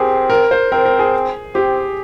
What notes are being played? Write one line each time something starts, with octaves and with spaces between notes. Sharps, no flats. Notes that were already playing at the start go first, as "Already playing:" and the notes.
Already playing: C4 G4 G#4 A#4
A#4
C5
C4 A#4
A#4
G#4
C4 G4